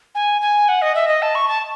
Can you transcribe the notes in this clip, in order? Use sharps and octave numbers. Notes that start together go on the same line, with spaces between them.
G#5
G#5
F#5
D#5
E5
D#5
A5
C#6
A5